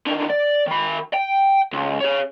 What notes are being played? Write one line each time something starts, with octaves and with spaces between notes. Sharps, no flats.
D3 D#3
D5
D#3 B5
G5
C#2
G#4 C#5